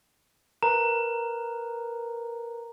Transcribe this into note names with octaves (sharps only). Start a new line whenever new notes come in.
A#4 B4 A#5